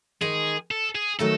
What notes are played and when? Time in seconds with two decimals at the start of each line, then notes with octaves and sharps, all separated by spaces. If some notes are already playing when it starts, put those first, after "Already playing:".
0.21 D#3 G#3 D#4 G#4
0.71 A4
0.95 G#4
1.19 D#3 F#3 A3 D#4 A4